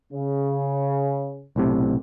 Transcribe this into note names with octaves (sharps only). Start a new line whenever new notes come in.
C#3
B1 A2 C3